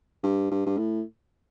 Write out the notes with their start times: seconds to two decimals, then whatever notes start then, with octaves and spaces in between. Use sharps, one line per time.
0.23 G2
0.51 G2
0.66 G2
0.78 A2